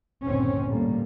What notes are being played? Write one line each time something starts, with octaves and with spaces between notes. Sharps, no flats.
G1 D#2 A#2 C4 C#4
A2 D3 G3 A#3